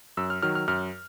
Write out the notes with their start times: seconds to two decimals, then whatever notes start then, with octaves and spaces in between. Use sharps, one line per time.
0.17 F#2 E6
0.30 F6
0.42 D#3 F#3 F6
0.55 F6
0.68 F#2 F6